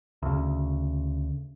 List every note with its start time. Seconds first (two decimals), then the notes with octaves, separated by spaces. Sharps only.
0.22 D2 C#3